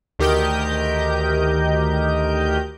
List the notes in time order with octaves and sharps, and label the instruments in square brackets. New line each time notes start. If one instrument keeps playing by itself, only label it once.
[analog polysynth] D2 D#3 G4 A#4 D#5 G6